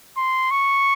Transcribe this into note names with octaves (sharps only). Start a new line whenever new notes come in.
C6
C#6